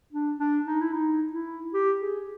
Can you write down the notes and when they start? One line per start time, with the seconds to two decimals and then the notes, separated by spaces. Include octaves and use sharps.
0.13 D4
0.39 D4
0.66 D#4
0.81 E4
0.93 D#4
1.33 E4
1.74 G4
2.01 G#4